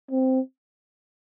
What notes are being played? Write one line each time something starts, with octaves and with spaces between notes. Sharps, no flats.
C4